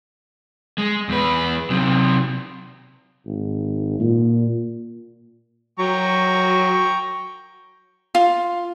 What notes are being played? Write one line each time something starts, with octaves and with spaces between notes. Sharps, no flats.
G#3
E2 B4
C3 F#3
G#1
A#2
F#3 G5 A#5 C#6
F4